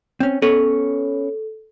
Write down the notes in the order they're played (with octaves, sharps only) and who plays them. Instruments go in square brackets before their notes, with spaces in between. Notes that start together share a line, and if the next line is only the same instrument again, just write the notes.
[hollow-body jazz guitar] C4 C#4
[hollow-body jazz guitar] B3 C#4 C#5 [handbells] A4